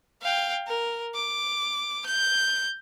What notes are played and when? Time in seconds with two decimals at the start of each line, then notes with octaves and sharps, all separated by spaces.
0.22 F5 G5
0.68 A#4
1.15 D6
2.06 G6